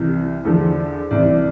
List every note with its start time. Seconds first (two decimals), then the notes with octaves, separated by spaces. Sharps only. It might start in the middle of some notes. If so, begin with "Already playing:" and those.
Already playing: C2 C3 E3
0.45 E2 D3 F3 A4
1.11 C2 C3 E3 D5